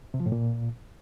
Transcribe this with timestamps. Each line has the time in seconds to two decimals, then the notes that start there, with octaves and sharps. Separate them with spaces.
0.14 C3
0.20 F3
0.26 A2
0.32 A#2